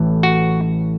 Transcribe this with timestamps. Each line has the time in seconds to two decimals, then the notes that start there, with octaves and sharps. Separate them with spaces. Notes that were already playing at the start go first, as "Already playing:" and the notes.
Already playing: A1 A2 E3
0.23 F#4